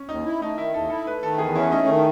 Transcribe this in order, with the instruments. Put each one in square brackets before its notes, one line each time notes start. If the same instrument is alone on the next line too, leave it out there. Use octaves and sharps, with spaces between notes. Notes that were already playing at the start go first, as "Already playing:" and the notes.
Already playing: [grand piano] C#4
[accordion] D#2 [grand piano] D#4
[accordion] E4
[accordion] A3 [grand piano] D#4
[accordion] D#3 [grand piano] E4
[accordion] D#2 [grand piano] A4
[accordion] E4 [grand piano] A4
[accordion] A3 [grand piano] B4
[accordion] D#3 [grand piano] A4
[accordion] E2 [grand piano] G#4
[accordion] C#4 [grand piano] E4
[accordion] A3 [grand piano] D#4
[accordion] D#3